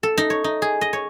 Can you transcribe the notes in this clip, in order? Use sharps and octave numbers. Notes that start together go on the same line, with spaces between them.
A4
D#4
C#5
D#4
G#4
D#5
C#5